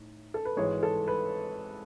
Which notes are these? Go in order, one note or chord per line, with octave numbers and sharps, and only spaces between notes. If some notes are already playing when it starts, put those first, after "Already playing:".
Already playing: A2 D#4
A4
B4
G#1 G#2 E3 G#3 C#5
A4
B4